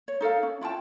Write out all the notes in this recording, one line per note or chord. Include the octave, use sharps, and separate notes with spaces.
C#5
D#4 A4 A#4 F5
C#4
E4 F4 G5 A5